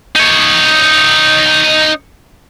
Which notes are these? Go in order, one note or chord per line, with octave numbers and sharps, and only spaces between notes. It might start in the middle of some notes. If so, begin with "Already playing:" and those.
D#4 C#5